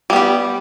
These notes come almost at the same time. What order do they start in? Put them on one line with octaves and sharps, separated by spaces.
G3 B3 G4